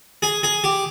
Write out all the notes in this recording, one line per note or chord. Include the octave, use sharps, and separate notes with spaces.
G#4
G#4
G4